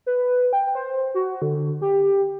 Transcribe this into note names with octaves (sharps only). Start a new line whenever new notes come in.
B4
G5
C5
F#4
D3
G4